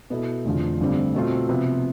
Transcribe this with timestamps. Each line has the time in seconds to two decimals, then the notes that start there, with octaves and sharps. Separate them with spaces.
0.10 B2 B3 E4 A4
0.45 F1 E2 D3 F3
0.80 A1 G2 D3 G3 C4
1.14 B2 A3 C4 F4
1.49 C3 F3 B3